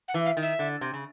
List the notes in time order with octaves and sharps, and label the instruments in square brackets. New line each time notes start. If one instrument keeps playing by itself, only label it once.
[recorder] F#5
[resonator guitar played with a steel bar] E3
[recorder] F5
[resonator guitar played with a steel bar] D#3
[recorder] E5
[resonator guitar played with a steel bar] D3
C3
C#3